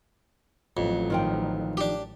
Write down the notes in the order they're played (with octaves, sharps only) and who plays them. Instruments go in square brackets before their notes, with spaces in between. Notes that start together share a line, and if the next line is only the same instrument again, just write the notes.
[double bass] A1 F#3 [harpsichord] F2
[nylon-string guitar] D#3 F3 G5
[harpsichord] D4 G4